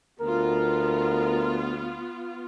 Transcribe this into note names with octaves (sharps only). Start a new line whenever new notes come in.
D2 B3 F4 A#4